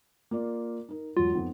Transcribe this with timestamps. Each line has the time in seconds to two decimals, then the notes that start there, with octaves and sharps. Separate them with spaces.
0.31 A#3 F4 D5
0.89 D#4 A#4
1.17 E1 F#3 F4
1.33 F2 B3 D#4